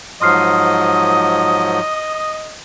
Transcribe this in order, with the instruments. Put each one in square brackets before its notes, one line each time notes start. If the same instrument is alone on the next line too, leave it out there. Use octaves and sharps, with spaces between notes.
[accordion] G#2 F3 F#3 [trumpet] D#5 [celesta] C6 F6 C7 [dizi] D#6